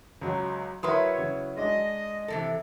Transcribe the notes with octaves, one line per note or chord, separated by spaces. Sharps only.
C#2 F#3
F#3 E4 A#4 B4 C#5 C6 D#6
C#3
G#3 D4 D#5
C3 E3 A4